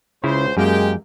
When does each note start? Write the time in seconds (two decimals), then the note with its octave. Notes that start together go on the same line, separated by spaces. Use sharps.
0.24 C#2 C#3 E4 C5
0.57 F#2 G#3 A#3 G4 G5